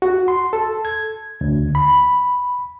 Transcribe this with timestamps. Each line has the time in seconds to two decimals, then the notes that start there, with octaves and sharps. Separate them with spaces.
0.02 F#4
0.28 C6
0.53 A4
0.85 G#6
1.41 D2
1.75 B5